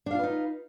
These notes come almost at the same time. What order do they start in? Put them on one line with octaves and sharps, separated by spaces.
D4 F5 F4 B4 D#4